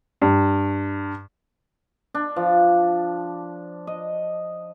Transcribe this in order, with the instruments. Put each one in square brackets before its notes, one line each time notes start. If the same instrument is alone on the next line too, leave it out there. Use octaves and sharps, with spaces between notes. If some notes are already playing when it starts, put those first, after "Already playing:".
[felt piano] G2
[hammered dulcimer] D4
F3
D#5